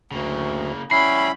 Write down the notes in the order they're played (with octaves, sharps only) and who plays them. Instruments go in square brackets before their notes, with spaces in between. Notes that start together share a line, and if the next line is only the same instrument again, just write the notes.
[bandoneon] D2 [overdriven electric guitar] C#3 A#3
[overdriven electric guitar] G3 F#4 [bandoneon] C#4 E4 [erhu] B5 [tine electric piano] C7